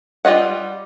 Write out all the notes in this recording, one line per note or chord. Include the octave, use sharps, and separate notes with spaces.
G3 F4 D#5 F#5